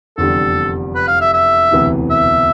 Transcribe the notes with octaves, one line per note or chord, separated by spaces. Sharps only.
F1 E2 D3 G3 A4
B4
F5
E5
E5
E1 D2 C3 E3 B3
E5